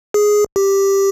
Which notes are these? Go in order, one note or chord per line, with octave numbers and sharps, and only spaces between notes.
G#4
G4